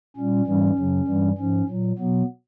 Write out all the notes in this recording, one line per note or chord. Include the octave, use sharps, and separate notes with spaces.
A#2 G3 C#4
G#2 E3 G3 C#4
F#2 C#3 F#3
G2 E3 G3
G#2 F3 C#4
A#2 F#3
B2 F#3 B3